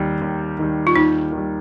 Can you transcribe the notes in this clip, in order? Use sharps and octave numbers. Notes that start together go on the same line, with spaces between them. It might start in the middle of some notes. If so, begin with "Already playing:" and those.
Already playing: D#2 D#3 G3
D#2
D#3 G3
F4
D#2 D#4
D#3
G3